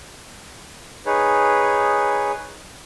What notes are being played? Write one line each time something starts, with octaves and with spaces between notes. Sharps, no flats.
D#4 G#4 B4 C#5